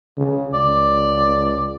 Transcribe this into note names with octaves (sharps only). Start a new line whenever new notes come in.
C#3
C#2 D5